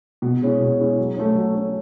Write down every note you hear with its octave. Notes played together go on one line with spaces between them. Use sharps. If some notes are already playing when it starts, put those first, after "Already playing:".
B2
G#3 C#4 E4 G#4
B2
G#3 C#4 E4 G#4
F#3
A3 C#4
F#3
A3 C#4